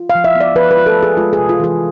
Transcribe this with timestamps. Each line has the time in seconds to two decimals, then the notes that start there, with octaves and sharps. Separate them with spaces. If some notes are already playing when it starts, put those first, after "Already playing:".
Already playing: F4
0.10 F5
0.15 F3
0.24 E5
0.35 B3
0.40 D5
0.55 F3 B4
0.71 B4
0.77 F4
0.86 A4
0.98 F3 G#4
1.17 G#3 F4
1.33 G#4
1.38 C3
1.49 F4
1.60 E3 G#4